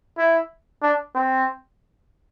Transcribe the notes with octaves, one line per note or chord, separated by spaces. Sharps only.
E4
D4
C4